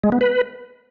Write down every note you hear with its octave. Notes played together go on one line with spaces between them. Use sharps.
G#3
B3
B4